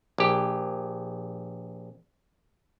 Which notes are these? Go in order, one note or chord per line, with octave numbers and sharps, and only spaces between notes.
A#1 G4